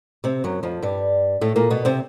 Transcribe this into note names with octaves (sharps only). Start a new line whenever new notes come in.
C3 C4
F#2 F#3
F2 F3
G2 G3
A2 A3
A#2 A#3
B2 B3
C3 C4